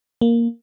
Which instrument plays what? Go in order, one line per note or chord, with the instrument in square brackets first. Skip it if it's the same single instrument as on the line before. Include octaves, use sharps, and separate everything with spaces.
[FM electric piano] A#3